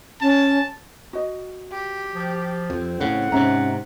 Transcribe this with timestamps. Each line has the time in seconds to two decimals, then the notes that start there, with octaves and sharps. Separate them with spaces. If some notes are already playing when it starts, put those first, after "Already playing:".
0.21 C#4 A5
1.13 F#4 D#5
1.71 G4
2.13 F3
2.70 F2 C4
3.01 A2 C#3 F#5
3.32 G#2 C3 C#4 E5 A#5